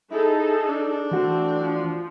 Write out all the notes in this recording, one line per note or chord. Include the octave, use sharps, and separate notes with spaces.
D#4 E4 G#4 A4
D4
E3 A3 C4 F#4
F3